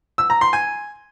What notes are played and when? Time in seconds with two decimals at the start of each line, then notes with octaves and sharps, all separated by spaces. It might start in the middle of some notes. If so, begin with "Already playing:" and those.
0.18 E6
0.30 A#5
0.41 C6
0.53 G#5